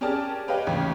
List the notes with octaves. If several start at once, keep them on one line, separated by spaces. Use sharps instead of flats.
C#4 G4 G#4 A#4 D5 A5
G4 B4 C#5 D#5 F5 G5
A1 D#2 C#3